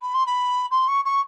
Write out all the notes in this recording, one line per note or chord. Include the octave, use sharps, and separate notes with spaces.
B5
C6
B5
C6
C#6
C#6